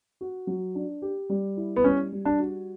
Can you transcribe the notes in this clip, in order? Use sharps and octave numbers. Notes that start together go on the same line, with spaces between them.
F#4
F#3
D4
G4
G3
E4
B3
G3 C#4
G3
D4
F#4